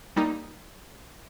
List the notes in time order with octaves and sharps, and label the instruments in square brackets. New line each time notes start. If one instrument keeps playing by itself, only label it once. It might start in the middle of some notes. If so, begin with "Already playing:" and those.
[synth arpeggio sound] G3 A#3 D#4